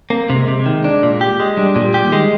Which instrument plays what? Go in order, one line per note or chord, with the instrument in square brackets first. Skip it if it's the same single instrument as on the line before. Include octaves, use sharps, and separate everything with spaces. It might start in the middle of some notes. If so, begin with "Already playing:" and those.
[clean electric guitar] A#3 [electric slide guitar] C4
[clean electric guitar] C3
[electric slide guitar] G#3
[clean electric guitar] C3
[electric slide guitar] G#3
[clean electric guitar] D#3
D4
A#2
G4
G#3
[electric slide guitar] G3 [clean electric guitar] D4
[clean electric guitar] A#2
[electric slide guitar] G3
[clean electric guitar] G4
[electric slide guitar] D#3
[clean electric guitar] G#3